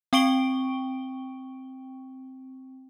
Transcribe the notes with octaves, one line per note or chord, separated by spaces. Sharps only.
C4 G5 C#6 D7 G7